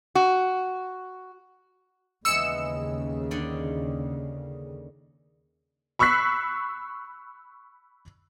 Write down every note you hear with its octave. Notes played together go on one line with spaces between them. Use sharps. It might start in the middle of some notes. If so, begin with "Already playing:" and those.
F#4
D#2 C#3 E3 G#3 B3 E6 C#7 E7
D3 D#3 D5
B5 C#6 E6 F#6 B6 C7